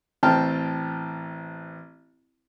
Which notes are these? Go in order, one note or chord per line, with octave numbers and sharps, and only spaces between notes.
A1 C4 G5 A5 F6